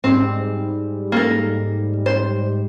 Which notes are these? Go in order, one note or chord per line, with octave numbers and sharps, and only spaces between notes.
G#2 G3 C4
A#3 A4 A#4
C5